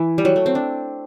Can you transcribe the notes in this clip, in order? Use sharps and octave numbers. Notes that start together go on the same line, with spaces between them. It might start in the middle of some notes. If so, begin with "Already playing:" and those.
Already playing: E3
G3
F#3
A3
C4
D4